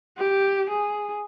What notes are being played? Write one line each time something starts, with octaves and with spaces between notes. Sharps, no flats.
G4
G#4